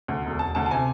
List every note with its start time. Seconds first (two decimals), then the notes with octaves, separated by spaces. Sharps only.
0.08 D2
0.25 E1
0.39 E1 A5
0.55 D2 A5
0.66 A5
0.71 C3 G#5